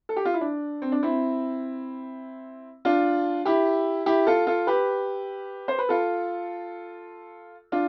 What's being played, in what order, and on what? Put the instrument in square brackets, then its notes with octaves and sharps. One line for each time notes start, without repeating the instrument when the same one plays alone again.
[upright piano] A4
G4
F4
E4
D4
C4
D4
C4 E4
D4 F4
E4 G4
E4 G4
F4 A4
F4 A4
G4 B4
C5
B4
F4 A4
D4 F4